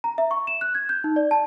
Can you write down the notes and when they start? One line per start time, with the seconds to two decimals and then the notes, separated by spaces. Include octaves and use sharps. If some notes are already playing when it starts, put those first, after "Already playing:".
0.04 A#5
0.18 E5
0.31 C#6
0.47 E7
0.61 F#6
0.75 G#6
0.89 G6
1.04 D#4
1.16 D5
1.31 A5